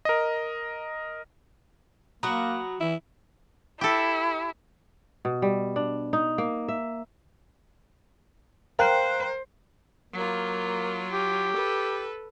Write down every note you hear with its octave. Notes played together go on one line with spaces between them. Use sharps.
A#4 D#5
F#3 A#3 F#4 A#5 B5 D#6
E3 E4
E4 G4 A4
B2
G3
D4
D#4
A#3
E5
A#4 C5 F5 G5 F#6
F#3 A#3 F4
G4
A4 B4